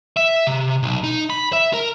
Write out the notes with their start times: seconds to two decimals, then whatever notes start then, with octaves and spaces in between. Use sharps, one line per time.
0.17 E5
0.47 C3
0.83 B1
1.04 D#4
1.30 B5
1.53 E5
1.73 A#4